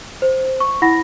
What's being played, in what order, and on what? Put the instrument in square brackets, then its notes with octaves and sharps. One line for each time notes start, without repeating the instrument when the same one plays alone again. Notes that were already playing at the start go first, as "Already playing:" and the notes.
[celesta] C5
C#6
E4 F#5 B5 A#6